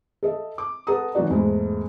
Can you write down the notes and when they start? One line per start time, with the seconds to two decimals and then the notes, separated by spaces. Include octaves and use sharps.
0.23 A4 D#5 E5
0.58 D6
0.87 A4 B4 F#5 A#5 D#6
1.15 E3 F#3 B3 D#4 F#4 D5
1.30 E2 G#2 G#3 A3